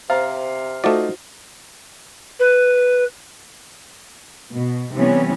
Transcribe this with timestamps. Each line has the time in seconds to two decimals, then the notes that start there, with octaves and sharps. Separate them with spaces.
0.10 C3 C5 F5 A#5
0.84 A3 D#4 F4 F#4 C5 D5 F#5
2.39 B4
4.54 B2
4.94 C3 E3 G3 B3 C#4